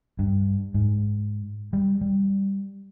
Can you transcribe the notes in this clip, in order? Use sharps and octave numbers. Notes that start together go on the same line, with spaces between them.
G2
G#2
G3
G3